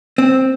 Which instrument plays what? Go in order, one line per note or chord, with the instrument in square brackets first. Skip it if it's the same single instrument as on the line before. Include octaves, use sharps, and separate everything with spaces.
[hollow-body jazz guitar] C4